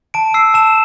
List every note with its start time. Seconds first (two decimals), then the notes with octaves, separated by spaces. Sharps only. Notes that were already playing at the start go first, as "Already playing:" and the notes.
0.14 A5 D7
0.34 E6 C7
0.54 A5 E7